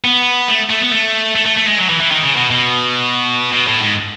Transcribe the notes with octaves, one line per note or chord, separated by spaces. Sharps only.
B3
A3
A3
B3
A3
A3
A3
A3
G#3
F#3
E3
E3
D#3
C#3
B2
B2
B2
A2
G#2